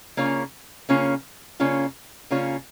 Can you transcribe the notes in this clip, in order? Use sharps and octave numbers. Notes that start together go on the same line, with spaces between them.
C#3 A#3 C#4 F4 C#5
C#3 A#3 C#4 F4 C#5
C#3 A#3 C#4 F4 C#5
C#3 A#3 C#4 F4 C#5